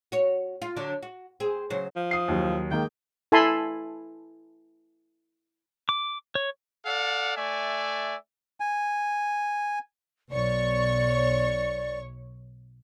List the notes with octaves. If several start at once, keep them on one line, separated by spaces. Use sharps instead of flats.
F#4 C#5
F4
D3 F#3 D4
F#4
C4 G#4
C#3 F#3 C5
F3
D#6 C7
D#2 F#3
D#3 G#3 A#3 G5
E4 A4 G#5 A5 B5 C6
D6
C#5
A4 D5 F5 F#5
A3 D5 E5 G#5
G#5
B1 C#5 D5 C#6